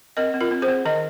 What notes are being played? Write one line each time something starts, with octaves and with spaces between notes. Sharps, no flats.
C4 A#4 D#5
C4
F4 A#4
C4
G#4 C5
C4
D#3 A#4 D#5